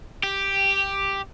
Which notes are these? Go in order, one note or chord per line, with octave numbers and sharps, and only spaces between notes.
G4